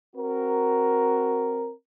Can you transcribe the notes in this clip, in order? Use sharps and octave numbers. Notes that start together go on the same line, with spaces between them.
C4 F#4 A#4